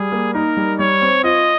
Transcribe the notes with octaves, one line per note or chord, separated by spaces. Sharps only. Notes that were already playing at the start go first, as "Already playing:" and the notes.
Already playing: G3 G#4
A#3
D#4 A#4
G3
G3 C#5
C4
F4 D#5